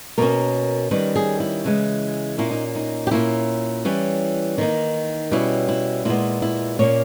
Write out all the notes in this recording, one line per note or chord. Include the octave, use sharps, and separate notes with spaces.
B2 A#3 C#4 A#4
D#3 G3 C#4 B4
G#4
E4
C#3 E3 G#3
A#2 A#3 C#4 E4
D#4
D#4
G4
A#2 A#3 C#4 E4
E3 G3 C#4
D#3 A#3 D#4
B2 G3 C#4 E4
E4
A#2 G#3 B3 E4
E4
A#2 A#3 C#4 C#5